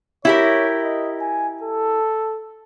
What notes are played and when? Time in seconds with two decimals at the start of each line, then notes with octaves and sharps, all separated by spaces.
0.25 E4 G4 A#4 C#5
0.82 D#5
1.21 G#5
1.62 A4